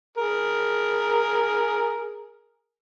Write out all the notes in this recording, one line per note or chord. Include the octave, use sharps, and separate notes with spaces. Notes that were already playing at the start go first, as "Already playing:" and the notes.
G#4 A#4